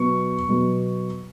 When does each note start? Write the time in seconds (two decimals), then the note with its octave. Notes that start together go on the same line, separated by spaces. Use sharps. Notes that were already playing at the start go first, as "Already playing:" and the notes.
Already playing: B2 F#3 B3 C#6
0.49 B2 F#3 B3